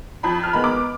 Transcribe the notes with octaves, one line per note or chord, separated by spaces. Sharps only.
F2 B5
F6
D#3 G#3 B3 B5
D6